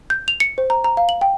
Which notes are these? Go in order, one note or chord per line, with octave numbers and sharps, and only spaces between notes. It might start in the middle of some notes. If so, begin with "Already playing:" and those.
G6
F7
C#7
C5
A#5
A#5
F5
F#7
G5